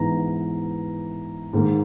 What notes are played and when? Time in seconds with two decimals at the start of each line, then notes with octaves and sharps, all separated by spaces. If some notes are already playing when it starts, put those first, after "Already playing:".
Already playing: G#2 E3 B3 A#5
1.53 G#2 D#3 A#3